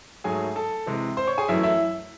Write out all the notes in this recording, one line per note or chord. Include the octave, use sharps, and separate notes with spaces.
G#2 F#3 A3 G#4 G#5
A4 A5
C3 E3 G#3
C5 C6
C#5 C#6
G#4 G#5
F#2 E3 A3 E4 E5
E4 E5